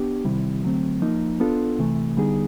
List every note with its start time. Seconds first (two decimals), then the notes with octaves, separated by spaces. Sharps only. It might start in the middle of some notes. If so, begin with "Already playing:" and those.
Already playing: B3 D4 G4
0.25 C3 D#3 G3 C4 E4
0.64 D3 F#3 A3 C4
1.02 F3 A#3 D#4
1.40 B3 D4 F4 A4
1.79 C3 E3 A3
2.17 D3 G3 B3 D#4 G#4